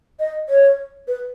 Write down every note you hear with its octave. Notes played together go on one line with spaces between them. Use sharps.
D#5
C#5
B4